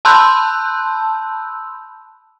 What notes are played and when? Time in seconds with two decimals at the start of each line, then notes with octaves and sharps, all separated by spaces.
0.05 A5 B5 C6 E6 F#6 G6